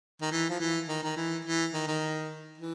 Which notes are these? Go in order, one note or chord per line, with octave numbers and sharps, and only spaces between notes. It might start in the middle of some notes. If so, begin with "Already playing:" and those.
D#3
E3
F3
E3
D#3
D#3
E3
E3
D#3
D#3
E3